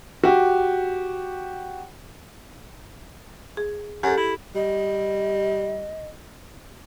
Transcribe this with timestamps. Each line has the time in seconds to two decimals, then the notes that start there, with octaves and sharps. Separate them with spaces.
0.24 F#4 G4
3.57 G#4
4.03 F#2 G4 A4
4.17 E4
4.55 G3 D#5